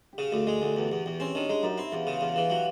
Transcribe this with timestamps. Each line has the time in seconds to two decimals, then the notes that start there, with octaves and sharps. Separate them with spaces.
0.13 G4
0.18 C#3 F#4
0.32 D2
0.47 G#3 G#4
0.62 D2 G4
0.76 E2 G4
0.91 E2 F#4
1.06 E2 G4
1.20 C4 C#4
1.35 D#3 D4
1.49 G#3 D#4
1.63 F#2 D#4
1.78 C4 E4
1.92 E2 F4
2.07 C#3
2.21 E2 F4
2.36 E3
2.50 F#3 G4